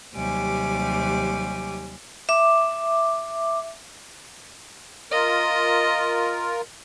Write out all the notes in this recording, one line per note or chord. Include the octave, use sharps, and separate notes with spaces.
D#2 C3 F#3 G3 G#5 D6
E5 D6
F4 A#4 D#5